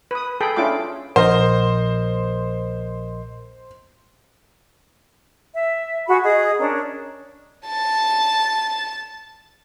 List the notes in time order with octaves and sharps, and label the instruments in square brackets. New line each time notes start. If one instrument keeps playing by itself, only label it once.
[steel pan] B4 D#6
G#4 A4 G5 B5
C#4 D4 E4 F4 G5 D6
[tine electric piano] A#1 A#4 D#5 [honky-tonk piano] C5
[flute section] E5
F#4 G#4 B5
G#4 D#5 D#6
C#4 D4 A#4
[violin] A5 A6